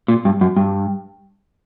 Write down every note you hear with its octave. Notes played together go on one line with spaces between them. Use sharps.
A#2
G2
F#2
G2